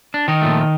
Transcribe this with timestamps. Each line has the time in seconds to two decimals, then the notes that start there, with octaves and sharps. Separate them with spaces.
0.14 D4
0.28 D#3 D#4
0.42 A#2 F3 A3